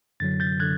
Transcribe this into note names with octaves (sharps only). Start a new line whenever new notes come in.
F#2 D3 F#3 A6
G6 A6
D3 F#6 G#6